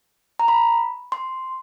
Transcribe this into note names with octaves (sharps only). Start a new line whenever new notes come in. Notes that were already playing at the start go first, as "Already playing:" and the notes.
A#5
B5
C6